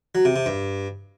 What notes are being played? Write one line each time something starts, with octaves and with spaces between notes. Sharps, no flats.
F#3
C3
C3
G2